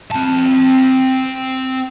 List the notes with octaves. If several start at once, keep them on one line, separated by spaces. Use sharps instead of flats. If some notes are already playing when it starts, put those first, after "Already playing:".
C4 A5